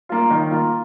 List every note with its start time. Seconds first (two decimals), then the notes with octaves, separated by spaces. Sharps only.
0.09 A#3 F4
0.31 D#3
0.51 A#3 F4